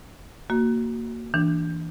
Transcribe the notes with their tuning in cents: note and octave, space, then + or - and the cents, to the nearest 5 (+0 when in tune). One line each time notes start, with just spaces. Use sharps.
A#3 -10 F#4 +0
E3 -15 D4 +0